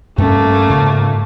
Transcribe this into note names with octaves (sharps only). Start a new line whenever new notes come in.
G2 A3 A#3 C#4
G#2 C#3